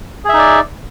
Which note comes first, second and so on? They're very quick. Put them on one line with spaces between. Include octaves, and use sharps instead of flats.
G#4 E5 D#4 D5